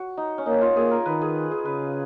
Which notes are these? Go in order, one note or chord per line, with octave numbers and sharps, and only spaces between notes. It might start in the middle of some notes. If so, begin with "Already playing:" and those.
Already playing: F#4
D#4
C#4
A#3 D#4
F4
A#3 G#4
A#4
D#3 B4
G#4
G#4
C#3 B4